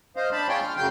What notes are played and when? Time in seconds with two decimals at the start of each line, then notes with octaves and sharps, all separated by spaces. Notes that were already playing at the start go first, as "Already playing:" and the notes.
0.16 C5 D#5 F5
0.32 D4 A5 B5
0.49 F4 G#4 C#5 G5 C6
0.61 F6
0.77 F#2 C#3 F#3 G5 C6 G6